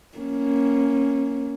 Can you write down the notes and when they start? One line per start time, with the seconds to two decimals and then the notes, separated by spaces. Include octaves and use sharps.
0.18 A#3 C#4